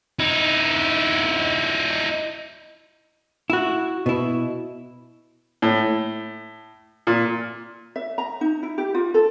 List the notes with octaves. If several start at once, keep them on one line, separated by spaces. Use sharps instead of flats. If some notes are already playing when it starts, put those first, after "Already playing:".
D#4 E4
E4 F#4
B2 E4
A2
A#2
E5
A#5
D#4
E4
G4
F4
A4